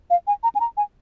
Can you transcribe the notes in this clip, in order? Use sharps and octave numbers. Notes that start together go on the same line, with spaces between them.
F5
G#5
A#5
G#5
A#5
G#5